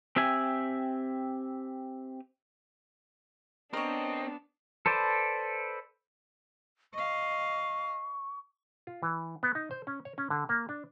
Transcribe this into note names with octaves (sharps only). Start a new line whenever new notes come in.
C4 G4 E5 G#5
B3 C4 D4 A#4 C#5 D#5
A4 B4 C5 D5
D#5 F5 C#6
F4
E3
B3
D#4
C5
C#4
C#5
C#4
D3
A#3
D4